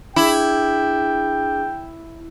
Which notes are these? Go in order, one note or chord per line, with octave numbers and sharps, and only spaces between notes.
D4 E4 G#4 G5